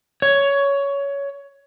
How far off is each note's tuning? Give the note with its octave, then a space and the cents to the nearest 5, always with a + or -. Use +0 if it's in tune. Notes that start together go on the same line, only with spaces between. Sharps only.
C#5 +15